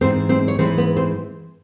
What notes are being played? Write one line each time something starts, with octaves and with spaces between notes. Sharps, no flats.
G#2 E3 G#3 C4 C5
C4 C5
C#5
G#2 E3 G#3 C4 C5
B3 B4
C4 C5